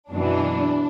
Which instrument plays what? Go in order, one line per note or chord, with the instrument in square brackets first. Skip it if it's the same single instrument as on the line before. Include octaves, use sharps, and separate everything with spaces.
[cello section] F#2 B2 E3 [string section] D4